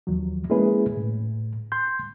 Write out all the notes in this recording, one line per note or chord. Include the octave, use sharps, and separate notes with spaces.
D#2 F3 F#3
G#3 A#3 C#4 E4 G#4 B4
A2
C6 G6